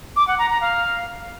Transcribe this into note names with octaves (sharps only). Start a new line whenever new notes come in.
D6
F#5
A#5
A#5
F5